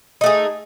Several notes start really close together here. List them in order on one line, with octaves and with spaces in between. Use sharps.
D#4 A3 G#4